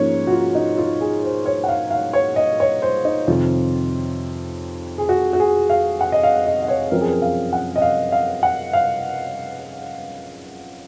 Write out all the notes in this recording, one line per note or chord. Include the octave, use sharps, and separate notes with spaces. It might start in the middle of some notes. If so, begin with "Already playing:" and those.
Already playing: G#2 F3 A#3 C#4 C#5
F#4
F4
D#4
F4
G#4
C5
C#5
F#5
F5
F5
C#5
D#5
C#5
C5
D#4
F2 C3 D#3 F4
G#4
F#4
F#4
G#4
F5
F#5
D#5
F5
D#5
D#5
C#5
F#2 F3 C4 A#4
G#4
A#4
F5
F#5
D#5
F5
F5
F#5
F5